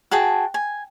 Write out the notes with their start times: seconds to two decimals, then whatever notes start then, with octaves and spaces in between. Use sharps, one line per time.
0.11 F#4 G#4 G5 A5
0.54 G#5